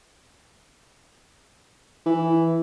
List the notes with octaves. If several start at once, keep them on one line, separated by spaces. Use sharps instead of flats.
E3